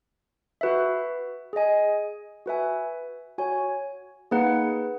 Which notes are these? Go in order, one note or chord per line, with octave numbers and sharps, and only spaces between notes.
F#4 B4 E5
G#4 D#5 G#5
F#4 B4 E5 G#5
F#4 C#5 G#5
A#3 D#4 G#4 B4 F#5